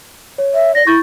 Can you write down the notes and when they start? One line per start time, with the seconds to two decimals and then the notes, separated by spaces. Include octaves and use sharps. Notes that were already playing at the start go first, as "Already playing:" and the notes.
0.38 C#5
0.54 E5
0.75 D5 A#6
0.87 E4 C#6 G6 A6